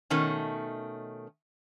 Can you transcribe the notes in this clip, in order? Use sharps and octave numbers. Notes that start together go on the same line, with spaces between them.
B2 D#3 A3 C#4